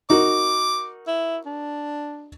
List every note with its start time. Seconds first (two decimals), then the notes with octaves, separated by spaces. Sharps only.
0.10 D#4 F#4 A#4 D6
1.07 E4
1.46 D4